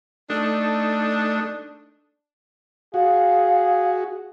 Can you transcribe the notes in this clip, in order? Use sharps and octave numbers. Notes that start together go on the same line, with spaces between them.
A3 D4 D#4 A4
F#4 G#4 F5